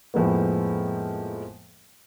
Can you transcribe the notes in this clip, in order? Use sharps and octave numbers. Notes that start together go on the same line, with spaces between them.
F2 A2 F3 G#3 A#3 B3